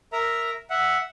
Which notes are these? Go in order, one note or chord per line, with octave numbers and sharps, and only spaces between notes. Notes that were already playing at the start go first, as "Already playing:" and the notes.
A#4 E5 A#5
E5 F#5